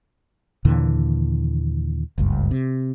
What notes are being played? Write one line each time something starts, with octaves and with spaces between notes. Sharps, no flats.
D#2 A#2 D3 E3
F#1 C#2 G2
C3